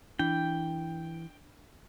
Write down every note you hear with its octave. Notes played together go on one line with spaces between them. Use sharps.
E3 D4 G5